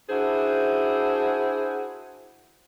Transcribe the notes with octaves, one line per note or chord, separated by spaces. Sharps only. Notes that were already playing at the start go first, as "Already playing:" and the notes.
D4 E4 F#4 G#4 C5